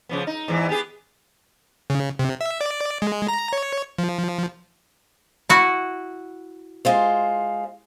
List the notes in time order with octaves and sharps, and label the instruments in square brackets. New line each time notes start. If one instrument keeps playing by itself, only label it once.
[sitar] C#3 F3 B3
D#4
E2 G#2 E3
B3 G4 G#4
[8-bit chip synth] C#3
C3
E5
D5
G#3
A#5
C#5
F3
[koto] E4 F#4
[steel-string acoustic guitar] G#3 F4 C5